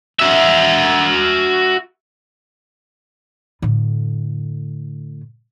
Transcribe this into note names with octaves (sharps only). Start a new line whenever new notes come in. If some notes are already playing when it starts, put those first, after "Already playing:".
F#4 E5
A2 D3